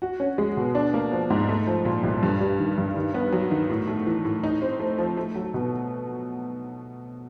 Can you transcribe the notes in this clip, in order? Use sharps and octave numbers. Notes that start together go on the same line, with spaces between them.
F#4
C#4
G#3
B2
D4
A#3
F3
G#2
A3
F3
A#2
C2
G2
G3
D#3
G2
D#3
B3
F#3
D#3
A2
A3
E3
A2
D#4
C4
A3
F3
A3
F#3
B2